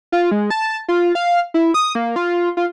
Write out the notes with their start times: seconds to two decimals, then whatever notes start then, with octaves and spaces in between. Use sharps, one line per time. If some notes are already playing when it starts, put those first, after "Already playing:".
0.12 F4
0.31 G#3
0.50 A5
0.88 F4
1.15 F5
1.54 E4
1.74 D#6
1.95 A#3
2.16 F4
2.57 F4